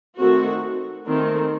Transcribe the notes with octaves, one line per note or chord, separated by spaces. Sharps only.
D#3 A3 C4 F#4
D#3 A3 C4